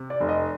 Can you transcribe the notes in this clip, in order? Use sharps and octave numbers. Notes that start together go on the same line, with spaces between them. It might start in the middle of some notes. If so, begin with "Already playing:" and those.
Already playing: C3
D5
F1
D#5